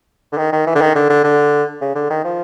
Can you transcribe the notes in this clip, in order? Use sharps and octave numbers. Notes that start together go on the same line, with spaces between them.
D3
D#3
D#3
E3
D3
D#3
D3
D3
D3
C#3
D3
D#3
F3